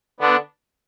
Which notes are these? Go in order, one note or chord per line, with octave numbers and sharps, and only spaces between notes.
D3 B3 D4